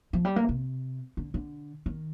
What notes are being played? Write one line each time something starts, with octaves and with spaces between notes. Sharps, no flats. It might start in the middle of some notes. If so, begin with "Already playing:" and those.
F3
G3
A#3
C3
D3
D3
D#3